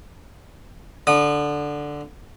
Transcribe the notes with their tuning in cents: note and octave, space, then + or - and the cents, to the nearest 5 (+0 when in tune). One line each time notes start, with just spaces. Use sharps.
D3 +0 D#6 -35